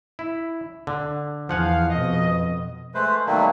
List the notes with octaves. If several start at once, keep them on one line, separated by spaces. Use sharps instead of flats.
E4
D3
E2 F3 F5 F#5 G#5
F2 B2 D#5
G#3 A3 B4 C5
B2 D#3 F#3 G3 A3 A#3